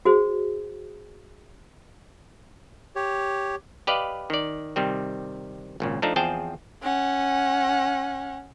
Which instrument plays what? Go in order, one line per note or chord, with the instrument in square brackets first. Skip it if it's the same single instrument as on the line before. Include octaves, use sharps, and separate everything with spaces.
[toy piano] F#4 G#4 C5
[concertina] G4 C#5
[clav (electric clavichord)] G4 B4 D5 D#5 F5
D#3 D5
C3 D#3 G3 C4
G#1 A#2 C#3
F3 A3 D4 D#4 E5 A#5
E2 F3 C4 G#4 G5 A5
[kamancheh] C#4 F#5